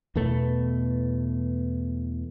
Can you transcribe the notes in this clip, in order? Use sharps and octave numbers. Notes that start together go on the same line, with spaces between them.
E2 B2 A3 B3